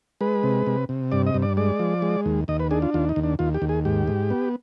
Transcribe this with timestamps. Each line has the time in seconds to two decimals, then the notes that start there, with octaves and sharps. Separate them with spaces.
0.21 G#3 B4
0.43 C3
0.66 C3
0.89 C3
1.12 G2 D5
1.27 D#5
1.34 G2
1.42 D5
1.57 G#3 D5
1.80 F3
2.02 G#3
2.26 D#2
2.48 D#2 D#5
2.60 B4
2.71 D4 G#4
2.82 F4
2.94 D#2 F4
3.09 D#4
3.16 D#2
3.24 D4
3.39 D#2 F4
3.54 G4
3.62 D#2
3.69 G#4
3.85 G#2 G4
4.07 G#2
4.30 B3